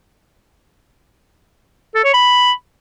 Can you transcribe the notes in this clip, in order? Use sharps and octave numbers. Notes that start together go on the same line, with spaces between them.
A4
C#5
B5